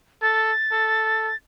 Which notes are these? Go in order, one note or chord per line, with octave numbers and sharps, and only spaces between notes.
A4 A6
A4